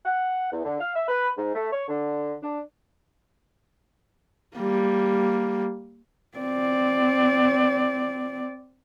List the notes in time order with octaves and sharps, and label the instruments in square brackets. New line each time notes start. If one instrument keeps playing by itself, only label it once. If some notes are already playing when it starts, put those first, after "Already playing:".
[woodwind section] F#5
E2
D3
F5
E5
B4
G#2
A3
C#5
D3
D4
[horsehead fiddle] G3 A#3
C4 D5